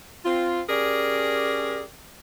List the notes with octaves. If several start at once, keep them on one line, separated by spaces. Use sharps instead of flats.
C4 F4
C#4 G4 G#4 A#4 D5